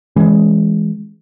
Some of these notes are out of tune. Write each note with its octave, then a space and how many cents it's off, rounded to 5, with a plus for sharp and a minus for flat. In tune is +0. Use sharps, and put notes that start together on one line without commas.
E3 +0 G#3 +0 C#4 +0